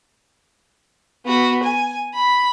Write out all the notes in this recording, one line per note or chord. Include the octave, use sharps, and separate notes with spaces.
B3 F#4
G#5
B5